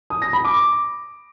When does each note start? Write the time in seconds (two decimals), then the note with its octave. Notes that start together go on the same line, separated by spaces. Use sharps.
0.10 D#6
0.22 A#6
0.33 B5
0.45 D6